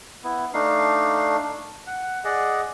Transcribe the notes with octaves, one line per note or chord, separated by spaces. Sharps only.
B3 E4
A3 D4 D#4 F5
F#5
G#4 D5 D#5 F#5